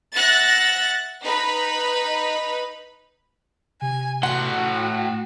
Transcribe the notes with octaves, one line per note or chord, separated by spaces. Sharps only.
E5 F#5 F#6 A6 A#6
D#4 B4 B5
C3 G#5
A2 F#4 F#5 C6
G5